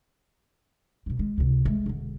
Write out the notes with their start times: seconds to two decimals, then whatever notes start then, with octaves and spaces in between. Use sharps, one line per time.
1.06 B2 F#3
1.19 G#3
1.38 C#2 C3
1.65 G#3 A3
1.86 E1 D3